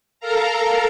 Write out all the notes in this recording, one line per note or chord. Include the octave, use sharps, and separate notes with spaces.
A4 A#4 F5 A#5